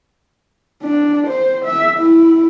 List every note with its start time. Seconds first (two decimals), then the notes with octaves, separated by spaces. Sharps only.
0.83 D4
1.27 C5
1.65 E5
2.00 E4